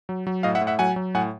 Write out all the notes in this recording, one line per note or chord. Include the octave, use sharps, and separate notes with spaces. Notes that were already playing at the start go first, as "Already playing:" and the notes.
F#3
F#3
A2 D#5 F5
E5 F#5
A2
E5 F#5
F#3 F#5 G#5
F#3
A2 F#5 G#5